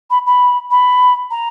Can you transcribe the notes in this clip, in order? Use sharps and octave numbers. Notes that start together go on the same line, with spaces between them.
B5
B5
B5
A#5